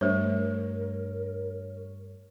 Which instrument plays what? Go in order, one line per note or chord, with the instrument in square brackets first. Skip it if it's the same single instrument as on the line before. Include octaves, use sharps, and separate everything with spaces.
[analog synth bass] G2 [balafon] A3 C5 [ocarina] A#4 [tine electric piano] C#5